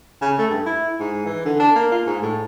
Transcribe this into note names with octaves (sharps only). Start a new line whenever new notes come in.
C#3
A3
G2
E4
G#2
E3
D3
D4
A#3
F4
G#2
A2